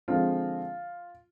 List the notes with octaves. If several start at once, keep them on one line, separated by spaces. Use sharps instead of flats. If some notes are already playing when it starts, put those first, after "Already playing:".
D3 F3 G#3 C4 F4